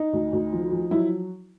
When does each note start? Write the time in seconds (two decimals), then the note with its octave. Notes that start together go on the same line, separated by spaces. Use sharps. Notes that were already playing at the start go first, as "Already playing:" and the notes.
Already playing: D#4
0.13 D2
0.33 D2
0.53 F3
0.72 F3
0.91 F#3 E4